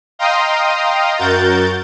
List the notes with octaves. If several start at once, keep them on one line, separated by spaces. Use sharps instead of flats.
D#5 F5 G5 A#5 C6 D#6
F#2 F#4 A#4 G6 A6